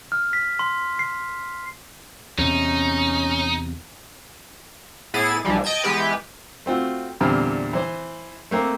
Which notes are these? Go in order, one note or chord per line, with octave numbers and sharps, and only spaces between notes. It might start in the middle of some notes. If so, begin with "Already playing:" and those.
F6
B6
C6
C7
E2 C3 C#4 D#4
A2 B3 E4 G#4 A6 D#7
B1 E3 F3 G3
D#5 G5 A5 G#6
E3 G#3 B3 G4 B4
A3 C4 F4 F#4
E2 A#2 D3 G3 C4 F6
E3 C5
A3 A#3 C4